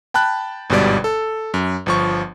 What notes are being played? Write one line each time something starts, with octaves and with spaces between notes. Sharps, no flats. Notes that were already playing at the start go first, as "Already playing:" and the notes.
G5 A5 B5 F#6
G1 G#2 B2 G3 D5
A4
F#2
G1 F3 C#6